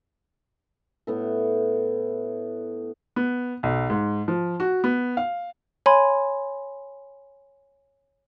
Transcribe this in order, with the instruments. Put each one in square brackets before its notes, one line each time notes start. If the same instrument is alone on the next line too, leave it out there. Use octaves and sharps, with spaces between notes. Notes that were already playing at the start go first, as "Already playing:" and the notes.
[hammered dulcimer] A2 B3 A4
[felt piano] B3
B1
G#2
F3
F#4
B3
F5
[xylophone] C#5 G#5 B5 C6